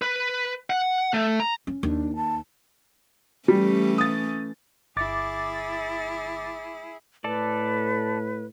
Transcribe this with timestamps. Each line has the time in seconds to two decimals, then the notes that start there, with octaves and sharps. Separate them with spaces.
0.02 B4
0.70 F#5
1.14 A3
1.40 A#5
1.67 C#4
1.83 D#2 D4
2.16 A5
3.48 E3 G3 A3 C#4
3.98 D#6 A6
4.97 G1 E4 G#4 D6 A6
7.24 A2 A4 B4 D5